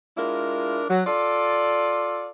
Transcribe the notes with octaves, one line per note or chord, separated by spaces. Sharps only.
G#3 D4 E4 F4 A#4
F#3
F4 A4 D5